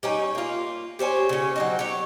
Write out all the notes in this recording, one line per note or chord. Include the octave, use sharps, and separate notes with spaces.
G3 C#4 D#4
A#3 F4
G4 C5 C#5 G#5
C#3 C#4
F#3 C4 D#4
G4 C#5